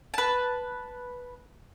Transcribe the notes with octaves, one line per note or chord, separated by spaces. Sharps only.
B4 A5